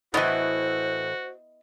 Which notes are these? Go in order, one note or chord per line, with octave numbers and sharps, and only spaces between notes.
A2 E3 B3 E4 F#4 C5 D#5